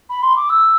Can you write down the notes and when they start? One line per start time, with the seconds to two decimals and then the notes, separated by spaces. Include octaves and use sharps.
0.10 B5
0.23 C6
0.36 D6
0.50 E6